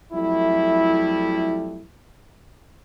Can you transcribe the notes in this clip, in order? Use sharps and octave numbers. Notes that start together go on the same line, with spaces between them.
F2 F#3 G3 A3 E4